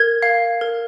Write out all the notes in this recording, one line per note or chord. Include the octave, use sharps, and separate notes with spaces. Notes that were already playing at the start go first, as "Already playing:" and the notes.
Already playing: A#4 G#6
F5
A#4